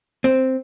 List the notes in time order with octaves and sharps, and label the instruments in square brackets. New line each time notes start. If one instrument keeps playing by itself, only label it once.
[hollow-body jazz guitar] C4